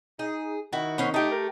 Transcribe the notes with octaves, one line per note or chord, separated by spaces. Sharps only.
D#4 G#4
D#3 E4 F#4
B3 C#4 C5
A3 D#4 G4
A#4